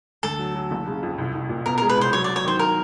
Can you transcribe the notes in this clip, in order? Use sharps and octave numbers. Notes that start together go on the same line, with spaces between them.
D2 A4
F#3
F#3
F#1
C#3
F2
C2
C2
A#2
B2 A#4
A#4
G#3
B4
C2
C5
F#3 C#5
D5
F#3
C#5
D#3 C5
A#4